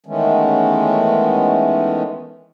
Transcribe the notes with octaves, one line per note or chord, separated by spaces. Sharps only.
D#3 E3 G#3 A3 B3 C#4